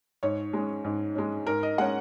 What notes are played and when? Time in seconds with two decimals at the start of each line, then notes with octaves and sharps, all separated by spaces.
0.23 G#2 C#5
0.53 G#3 C#4
0.84 G#2
1.15 G#3 C#4
1.47 G#2 A#4
1.63 D#5
1.78 G#3 C#4 F#5